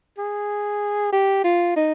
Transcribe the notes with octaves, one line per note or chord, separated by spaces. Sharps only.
G#4
G4
F4
D#4